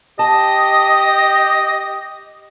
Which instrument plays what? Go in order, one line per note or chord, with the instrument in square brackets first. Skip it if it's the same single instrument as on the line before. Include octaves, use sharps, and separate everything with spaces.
[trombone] G4 [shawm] D#5 [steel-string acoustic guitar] A5